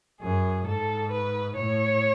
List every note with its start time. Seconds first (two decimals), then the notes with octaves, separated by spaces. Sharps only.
0.21 F#2 G#4
0.67 G#2 A4
1.11 B4
1.56 A2 C#5